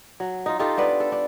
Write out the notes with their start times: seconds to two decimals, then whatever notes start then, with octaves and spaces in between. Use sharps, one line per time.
0.20 F#3
0.46 D#4 F4
0.59 D#4 F4 G4 A4
0.77 B3 D4 B4
1.00 A4
1.12 D4